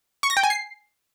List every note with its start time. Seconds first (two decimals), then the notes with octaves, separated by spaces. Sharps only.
0.23 C#6
0.30 A#6
0.37 G5
0.43 G#5
0.50 C7